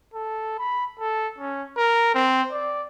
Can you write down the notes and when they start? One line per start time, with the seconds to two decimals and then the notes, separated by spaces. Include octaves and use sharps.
0.14 A4
0.59 B5
1.00 A4
1.39 C#4
1.77 A#4
2.15 C4
2.52 D5